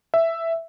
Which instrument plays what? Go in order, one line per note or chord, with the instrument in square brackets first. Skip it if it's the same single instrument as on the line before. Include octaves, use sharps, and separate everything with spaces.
[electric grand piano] E5